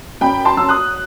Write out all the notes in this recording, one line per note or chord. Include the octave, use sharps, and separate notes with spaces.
F#2 G5 B5
A5 C6
F#3 E6
D#6 F#6